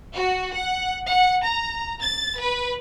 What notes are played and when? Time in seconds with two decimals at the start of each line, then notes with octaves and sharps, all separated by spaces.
0.17 F#4
0.56 F#5
1.08 F#5
1.44 A#5
2.01 A6
2.40 B4